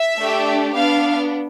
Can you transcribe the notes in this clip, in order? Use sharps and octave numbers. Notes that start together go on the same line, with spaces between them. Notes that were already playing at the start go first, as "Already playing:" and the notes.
Already playing: E5
A3 D4 G4
B3 D4 F5